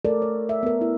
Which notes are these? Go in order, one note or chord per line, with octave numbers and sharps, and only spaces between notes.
A3 A4 A#4 D5
C#5
E5
B3 A#4
E4